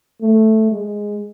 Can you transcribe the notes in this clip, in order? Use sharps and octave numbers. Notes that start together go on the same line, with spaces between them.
A3
G#3